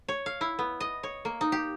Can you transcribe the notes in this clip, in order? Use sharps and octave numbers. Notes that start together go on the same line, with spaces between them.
C#5
F5
E4
B3
D#5
C#5
A#3
D#4
G4